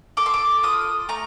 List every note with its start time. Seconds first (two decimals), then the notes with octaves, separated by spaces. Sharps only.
0.17 A4 D6
0.26 C6
0.34 D6
0.63 F4 D#6
1.09 A3 A#5